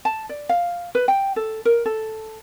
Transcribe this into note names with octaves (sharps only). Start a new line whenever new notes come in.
A5
D5
F5
B4
G5
A4
A#4
A4